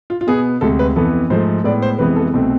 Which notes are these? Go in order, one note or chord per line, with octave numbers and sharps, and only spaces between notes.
F4
F4
B2 B3 G#4
D2 C3 G#3 A4
B4
F2 E3 B3 A4
G#2 F3 A3 C5
A2 G#3 B3 D5
C5
F2 C3 E3 G#3 B3 B4
A4
C2 B2 A3 C4